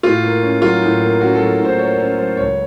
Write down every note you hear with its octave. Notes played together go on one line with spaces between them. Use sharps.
A2 F4
A#3
C#4
F#3 F4
A2
A#3
C#4 F#4
A4
F#3
A2
C5
A#3 C#5
C#4 C#5
F#3 C5
C#2 C#5